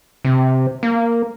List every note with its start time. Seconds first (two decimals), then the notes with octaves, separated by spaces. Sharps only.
0.25 C3
0.83 A#3